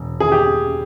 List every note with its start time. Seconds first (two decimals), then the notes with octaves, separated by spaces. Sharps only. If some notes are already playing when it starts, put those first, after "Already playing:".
Already playing: E1
0.20 G#4
0.32 G4